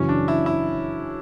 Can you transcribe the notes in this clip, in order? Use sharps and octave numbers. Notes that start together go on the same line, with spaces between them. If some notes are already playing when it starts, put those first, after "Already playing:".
Already playing: F#2 C#3 E3 C#4
D4
E4
E4